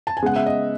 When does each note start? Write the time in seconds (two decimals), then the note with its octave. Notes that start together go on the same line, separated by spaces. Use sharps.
0.07 A5
0.17 G#5
0.22 C#3 G#3 B3 F#5
0.36 E5
0.46 D#5